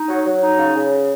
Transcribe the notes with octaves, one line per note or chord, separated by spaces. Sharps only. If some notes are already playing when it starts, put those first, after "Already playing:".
Already playing: D#4
F#3
F#3
D#4
C#3
C#3